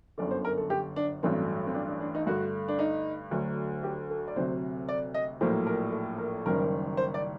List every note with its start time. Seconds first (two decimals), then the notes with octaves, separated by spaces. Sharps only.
0.18 G1 F#2 D3 D5
0.31 C5
0.45 A#4
0.58 A4
0.70 G4
0.96 D4
1.23 A1 G2 F#3 A3 C4
1.67 C4
1.74 D4
1.88 D4
2.00 D4
2.15 D#4
2.27 G2 D3 A3 F#4
2.68 D4
2.79 D#4
3.31 D2 D3 F#3 A3
3.83 G4
4.10 A4
4.28 D5
4.36 D2 C3 F#3 C5
4.89 D5
5.14 D#5
5.41 A#1 A2 F#3 A#3 C5
5.67 A#4
5.92 A4
6.18 A#4
6.46 F#1 F#2 D#3 G3 A#4
6.97 C5
7.14 D5